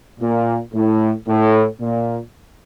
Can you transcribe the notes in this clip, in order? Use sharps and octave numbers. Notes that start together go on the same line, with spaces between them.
A#2
A2
A2
A#2